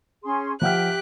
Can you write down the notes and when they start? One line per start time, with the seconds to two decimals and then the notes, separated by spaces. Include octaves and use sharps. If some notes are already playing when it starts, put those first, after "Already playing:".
0.23 C#4 G#4 C6
0.62 F3 G4 E5 F#5 G5 F6 F#6